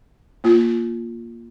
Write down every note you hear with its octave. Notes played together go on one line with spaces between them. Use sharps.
A#3 F4